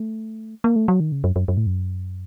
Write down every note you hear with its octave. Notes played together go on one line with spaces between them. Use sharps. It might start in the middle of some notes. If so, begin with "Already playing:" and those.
Already playing: A3
A#3
A3
F#3
D#3
C#3
F#2
F#2
F#2
A2
F#2